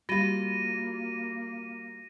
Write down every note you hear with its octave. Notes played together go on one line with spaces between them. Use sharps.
G3 A#3 F4 F#4 A#6 D#7